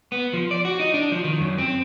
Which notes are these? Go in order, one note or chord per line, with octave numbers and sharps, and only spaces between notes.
B3
F3
D5
F#4
D#4
D4
F3
D#3
F#2
C4